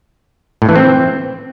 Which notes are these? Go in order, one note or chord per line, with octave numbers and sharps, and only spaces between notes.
A2
E3
C4